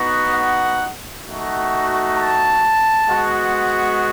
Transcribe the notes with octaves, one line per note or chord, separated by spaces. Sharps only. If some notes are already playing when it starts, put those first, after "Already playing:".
Already playing: B3 D#4 F#4
F#5
A3 D#4 F#4
A5
G#3 B3 F#4